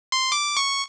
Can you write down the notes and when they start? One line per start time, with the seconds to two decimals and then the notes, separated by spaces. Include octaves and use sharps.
0.12 C6
0.32 D6
0.57 C#6